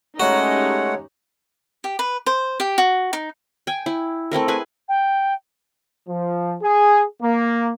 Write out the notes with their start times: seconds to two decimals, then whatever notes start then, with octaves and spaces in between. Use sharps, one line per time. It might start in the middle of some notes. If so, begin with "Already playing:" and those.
0.20 G#3 A3 C#4 D#4 F#4 G4 C#5 F#5
1.84 G4
1.99 B4
2.26 C5
2.60 G4
2.78 F#4
3.13 D#4
3.67 G5 G#5
3.86 E4
4.31 A3 C4 E4 A#4
4.48 E4 G#4 B4 G#5
4.88 G5
6.07 F3
6.61 G#4
7.21 A#3